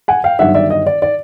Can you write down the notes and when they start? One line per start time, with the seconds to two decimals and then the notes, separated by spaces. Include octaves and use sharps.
0.08 F#5 G#5
0.24 F5 G5
0.39 G1 G2 D#3 F#3 E5 F#5
0.55 D5 E5
0.70 D#5
0.87 D5
1.02 D5